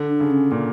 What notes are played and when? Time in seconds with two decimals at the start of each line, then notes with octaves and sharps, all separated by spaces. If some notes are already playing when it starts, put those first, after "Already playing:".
Already playing: D3
0.09 D4
0.20 C#3
0.31 C#4
0.51 A#2 A#3